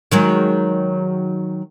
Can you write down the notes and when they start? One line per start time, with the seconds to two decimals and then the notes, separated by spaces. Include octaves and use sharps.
0.12 D#3 F#3 G#3